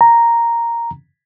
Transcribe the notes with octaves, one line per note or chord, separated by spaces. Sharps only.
A#5